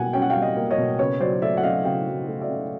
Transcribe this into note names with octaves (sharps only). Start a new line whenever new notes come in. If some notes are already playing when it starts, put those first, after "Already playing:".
Already playing: B2 G3 A#3 F#5 G#5
C#4 G5
F#5
F5 G5
G3
D#5 F5
A#3
C#5 D#5
B2
C#3 B4 C#5
F#3 C5 D5
A3 D5 E5
F#5
C#3 D#5 F5
C#3 F5 G5
F#3
A3
D5 E5
C#3